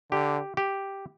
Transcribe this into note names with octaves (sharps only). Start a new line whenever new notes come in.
D3 G4
G4